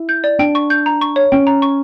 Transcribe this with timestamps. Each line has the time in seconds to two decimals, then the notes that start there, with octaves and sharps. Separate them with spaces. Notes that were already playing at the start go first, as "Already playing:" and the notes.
Already playing: E4
0.09 G6
0.24 D5
0.39 D4 G5
0.55 C#6
0.70 G6
0.86 A#5
1.01 C#6
1.16 C#5
1.32 C#4 G5
1.47 A#5
1.62 C#6